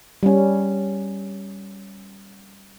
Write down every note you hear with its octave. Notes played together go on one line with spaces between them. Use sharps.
G3 C#4